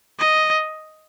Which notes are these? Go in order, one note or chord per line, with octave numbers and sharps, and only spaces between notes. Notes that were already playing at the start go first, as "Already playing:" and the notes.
D#5